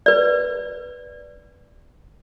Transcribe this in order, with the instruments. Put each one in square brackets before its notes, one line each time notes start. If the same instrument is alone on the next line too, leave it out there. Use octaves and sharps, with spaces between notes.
[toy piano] B4 D5